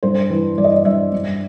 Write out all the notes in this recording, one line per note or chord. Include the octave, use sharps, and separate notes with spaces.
G2 C5
E3 B4
G2 D5
D#5
D5
G2 E5
G2